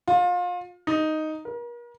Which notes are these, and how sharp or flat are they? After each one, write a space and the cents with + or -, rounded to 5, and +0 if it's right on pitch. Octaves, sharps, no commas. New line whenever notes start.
F4 +30
D#4 +0
A#4 +40